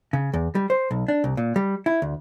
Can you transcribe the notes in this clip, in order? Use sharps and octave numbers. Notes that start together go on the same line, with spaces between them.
C#3
E2
G3
C5
B1
D4
C2
A#2
G3
E4
D2